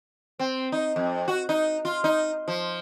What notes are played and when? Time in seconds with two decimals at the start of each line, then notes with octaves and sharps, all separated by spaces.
0.39 C4
0.72 D#4
0.96 F2
1.28 F#4
1.49 D#4
1.85 F4
2.04 D#4
2.48 F3